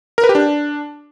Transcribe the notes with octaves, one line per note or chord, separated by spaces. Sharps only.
A#4
B4
G4
D4